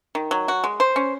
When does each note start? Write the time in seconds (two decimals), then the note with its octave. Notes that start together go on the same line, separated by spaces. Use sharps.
0.15 D#3
0.31 F#3
0.48 F#4
0.64 G#3
0.80 C5
0.96 C#4